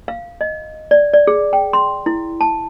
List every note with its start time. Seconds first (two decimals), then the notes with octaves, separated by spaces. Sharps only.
0.08 F5
0.41 D#5
0.91 D5
1.13 D5
1.27 G#4
1.53 G5
1.73 C6
2.06 E4
2.41 A5